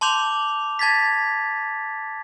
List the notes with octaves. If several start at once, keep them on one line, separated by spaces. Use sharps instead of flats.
A5 C6 D6 G6 F7
A5 G#6 A6 B6